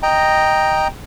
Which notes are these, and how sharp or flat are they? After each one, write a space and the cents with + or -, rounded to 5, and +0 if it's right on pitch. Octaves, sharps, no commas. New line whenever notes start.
D#5 +0 G5 +0 A#5 +0